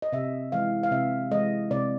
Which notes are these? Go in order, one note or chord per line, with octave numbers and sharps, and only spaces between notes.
D#5
C3 E5
E3 G#3 F5
F5
C3 E5
E3 G#3 D#5
C3 D5